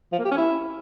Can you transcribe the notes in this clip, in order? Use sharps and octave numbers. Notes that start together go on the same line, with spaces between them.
F3
A#3
G4
C#4
E4